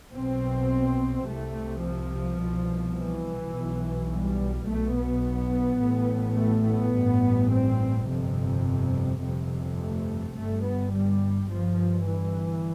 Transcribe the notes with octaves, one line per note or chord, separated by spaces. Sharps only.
B1 B2 C4
C2 C3 A3
F3
C2 B2
E3
B1 B2
G3
B1 B2 A3
B3
A1 A2
A3
B3
A1 G2
C4
G1 F2 C3
G1 F2 C3
A3
G1 G2 A3
B3
G3
G1 G2 F3
E3